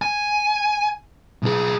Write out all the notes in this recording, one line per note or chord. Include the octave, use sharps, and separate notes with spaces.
G#5
B1 G#4